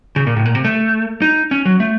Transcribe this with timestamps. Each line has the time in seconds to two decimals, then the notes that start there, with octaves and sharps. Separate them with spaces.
0.16 C#3
0.27 A#2
0.36 A2
0.45 A#2
0.55 C3
0.65 A3
1.22 D#4
1.51 C#4
1.65 F#3
1.80 A3